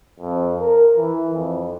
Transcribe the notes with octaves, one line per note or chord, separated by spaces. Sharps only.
F2
A#4
E3
F2